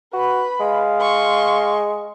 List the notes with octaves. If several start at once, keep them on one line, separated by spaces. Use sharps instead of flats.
F#4 B4 B5
G#3 F5
C6 C#6